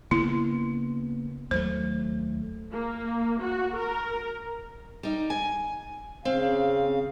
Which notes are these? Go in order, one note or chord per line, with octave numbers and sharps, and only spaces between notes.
C#3 A#3 B3 E4
D#2 F#3 A3 C5
A#3
F#4
A#4
G3 D#4
G#5
C#3 C4 F5